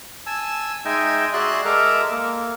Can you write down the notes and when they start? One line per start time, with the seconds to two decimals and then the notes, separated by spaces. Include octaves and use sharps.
0.26 G#5 A5 E6
0.85 G#3 D#4 D#5 E5 G5 G#5
1.33 F#4 G#4 D5 E5 C6 F#6
1.65 G#3 A4 A#4 E5 A#5 D6
2.11 A#3